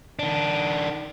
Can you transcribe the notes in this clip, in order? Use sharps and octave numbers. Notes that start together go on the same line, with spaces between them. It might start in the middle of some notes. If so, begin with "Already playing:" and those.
D#3 D4